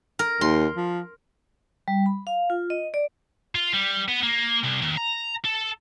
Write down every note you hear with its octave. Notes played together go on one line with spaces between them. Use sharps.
A#4
D#2 C6
F3
G3
B5
F5
F4
D#5
D5
F4
G3
B3
A#3
C2
D#2
A#5
A4